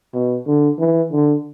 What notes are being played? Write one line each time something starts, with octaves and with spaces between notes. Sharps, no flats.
B2
D3
E3
D3